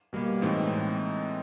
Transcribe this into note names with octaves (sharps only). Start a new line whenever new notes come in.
B2 G3 A#3
A2 E3 G#3 C4 D#4